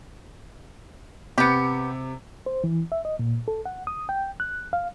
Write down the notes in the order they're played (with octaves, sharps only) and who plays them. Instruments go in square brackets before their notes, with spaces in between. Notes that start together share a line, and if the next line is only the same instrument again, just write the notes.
[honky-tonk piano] C3 C#7 [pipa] B3 G4
[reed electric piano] C5
E3
E5
D#5
A#2
A4
F#5
D#6
G5
F#6
F5